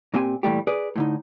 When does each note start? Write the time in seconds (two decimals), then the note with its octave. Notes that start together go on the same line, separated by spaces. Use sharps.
0.14 A#2 A#3 C4 G4 G#5
0.43 A#2 E3 G3 A3 G4
0.67 G#4 B4 D5
0.96 A2 D3 D#4